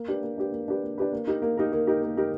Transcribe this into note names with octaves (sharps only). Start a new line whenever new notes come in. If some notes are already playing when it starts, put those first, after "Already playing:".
Already playing: A#3
D4 G4 B4
A#3
D4 G4 B4
A#3
D4 G4 B4
A#3
D4 G4 B4
A#3
D#4 G4 A#4
A#3
D#4 G4 A#4
A#3
D#4 G4 A#4
A#3
D#4 G4 A#4